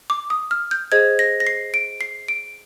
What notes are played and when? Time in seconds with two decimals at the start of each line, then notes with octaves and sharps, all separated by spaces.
0.10 D6
0.30 D#6
0.51 F6
0.71 G6
0.92 G#4 C5 D#5 G#6
1.19 A#6
1.40 A#6
1.47 C7
1.74 D7
2.01 C7
2.28 D7